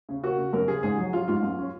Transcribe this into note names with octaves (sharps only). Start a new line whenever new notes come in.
C#3
A#3 F#4
C#3
F#2 A#4
C#3 G#4
G#2 G#4
F#3
F#3 F4
G#2 F4
F#2
C#4